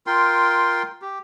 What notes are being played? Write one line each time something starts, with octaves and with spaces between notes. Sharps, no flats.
F4 A#4 G5 C6
G4